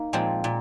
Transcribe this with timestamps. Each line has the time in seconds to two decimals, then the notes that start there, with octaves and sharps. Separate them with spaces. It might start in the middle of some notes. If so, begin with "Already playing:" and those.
Already playing: A#3 D#4
0.13 A#2 F3 G#3 C4
0.44 A#2